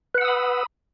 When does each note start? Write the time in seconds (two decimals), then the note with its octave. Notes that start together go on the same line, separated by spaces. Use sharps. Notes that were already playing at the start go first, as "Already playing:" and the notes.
0.15 B4
0.18 F#5
0.21 E6
0.25 D#6
0.28 B5